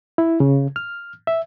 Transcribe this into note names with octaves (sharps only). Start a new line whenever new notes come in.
E4
C#3
F6
E5